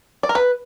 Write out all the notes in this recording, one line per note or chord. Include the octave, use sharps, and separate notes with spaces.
D5
A#4
B4